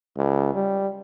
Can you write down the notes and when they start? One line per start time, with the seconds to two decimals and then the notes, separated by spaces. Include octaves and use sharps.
0.17 C#2
0.54 G3